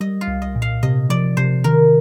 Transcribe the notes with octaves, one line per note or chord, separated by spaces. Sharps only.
G3 D#5
F4
C2
D#5
A#2
F5
C3 D#5
F3 D5
C3 C5
D#3 A#4